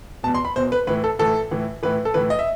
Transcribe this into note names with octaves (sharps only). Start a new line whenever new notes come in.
E2 B2 A5
C6
B5
E2 B2 C5
B4
A2 E3 B4
A4
A2 E3 A4
A2 E3
A2 E3 B4
A4
A2 E3 B4
D#5
E5